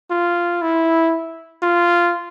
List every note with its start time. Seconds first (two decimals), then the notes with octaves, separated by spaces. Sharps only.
0.11 F4
0.62 E4
1.63 F4